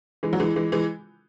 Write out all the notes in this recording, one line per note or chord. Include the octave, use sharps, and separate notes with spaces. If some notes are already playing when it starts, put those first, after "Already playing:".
E3 G#3
F#3
E3 G#3
E3 G#3
E3 G#3